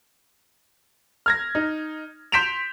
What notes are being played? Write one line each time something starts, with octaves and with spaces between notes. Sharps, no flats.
F6 G#6 A#6
D#4
C6 G6 B6 D7 E7 F7